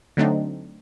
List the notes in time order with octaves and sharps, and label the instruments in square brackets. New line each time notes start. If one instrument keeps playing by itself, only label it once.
[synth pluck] D3 F#3 A3 C4 D4 D#4